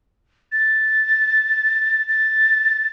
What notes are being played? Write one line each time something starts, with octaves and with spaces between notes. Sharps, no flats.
A6
A6